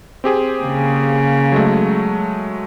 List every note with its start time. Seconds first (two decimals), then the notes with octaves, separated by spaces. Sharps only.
0.24 C4 G4 G#4
0.61 C#3 A#3
1.52 F#3 G#3 A3